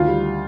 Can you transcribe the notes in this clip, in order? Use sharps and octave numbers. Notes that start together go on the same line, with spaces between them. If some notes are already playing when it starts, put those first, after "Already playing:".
Already playing: D2 D#3 F4 F5
G3